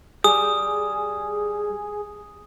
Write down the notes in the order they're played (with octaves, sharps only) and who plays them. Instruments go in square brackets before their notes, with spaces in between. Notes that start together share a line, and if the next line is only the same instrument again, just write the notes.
[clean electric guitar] G3 [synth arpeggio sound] G#4 [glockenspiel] D#6